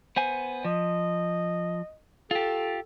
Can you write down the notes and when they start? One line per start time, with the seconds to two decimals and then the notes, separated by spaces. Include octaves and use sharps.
0.16 B3 C5 G#5
0.65 F3 D#5
2.31 F4 G4 A4